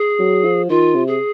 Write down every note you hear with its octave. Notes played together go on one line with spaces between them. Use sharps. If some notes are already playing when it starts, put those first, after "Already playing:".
Already playing: G#4
F#3
F3
D#3 F4
C3
G#4